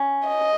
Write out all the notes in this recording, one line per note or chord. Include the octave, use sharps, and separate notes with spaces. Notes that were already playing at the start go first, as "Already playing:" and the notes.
Already playing: C#4
D#5